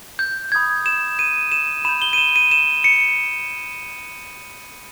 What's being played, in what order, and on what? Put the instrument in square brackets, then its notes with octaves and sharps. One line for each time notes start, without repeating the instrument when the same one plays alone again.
[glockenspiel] G6
B5 D#6 G6 G#6
E7
D#7
E7
B5 G6 E7
G7
D#7
E7
D#7
E7
C#7